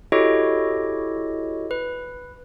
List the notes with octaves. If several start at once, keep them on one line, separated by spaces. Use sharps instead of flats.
E4 F#4 G4 A4 C#5 D#5
B4